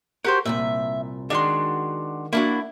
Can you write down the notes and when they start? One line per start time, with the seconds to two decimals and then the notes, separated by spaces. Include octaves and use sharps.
0.25 F#4 G4 A#4 C5
0.45 C2 F2 A#2 E5
1.30 D#3 G#3 D4 F#4 C6
2.33 A#3 D4 E4 F#4